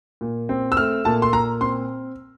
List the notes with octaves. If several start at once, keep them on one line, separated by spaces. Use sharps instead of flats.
A#2
C4
E6
A3 F6
A#2 A5
C6
A#2 A#5
C4 C6